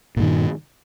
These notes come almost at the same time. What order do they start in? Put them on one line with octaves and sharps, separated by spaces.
A#2 G2 D#3